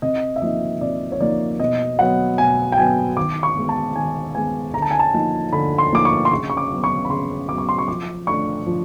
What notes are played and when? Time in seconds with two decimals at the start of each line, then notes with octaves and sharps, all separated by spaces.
0.02 C3 D#5
0.36 E5
0.42 F3 A#3 D#4 D#5
0.81 C3 D5
1.12 C#5
1.20 F3 A#3 D#4 D5
1.60 B2 D#5
1.99 F#3 B3 F#5
2.38 B2 G#5
2.72 G5
2.77 F#3 B3 G#5
3.17 D#3 D6
3.43 C#6
3.56 G#3 B3
3.69 A5
3.96 D#3 G#5
4.35 G#3 B3 G#5
4.74 D3 A#5
4.82 A5
4.91 G#5
4.99 A5
5.13 F3 A#3 D#4
5.52 D3 B5
5.78 C6
5.92 F3 A#3 D#4 D6
6.05 C#6
6.25 C6
6.31 C#3 C#6
6.50 C#6
6.57 D6
6.71 F#3 B3
6.84 C#6
7.05 B5
7.10 C#3 C6
7.48 F#3 B3 D6
7.58 C#6
7.69 C6
7.78 C#6
7.88 F3 D6
8.27 A3 D4 C#6
8.66 F3